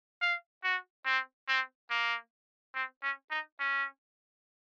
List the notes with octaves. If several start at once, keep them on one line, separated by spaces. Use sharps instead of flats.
F5
F#4
C4
C4
A#3
C4
C#4
D#4
C#4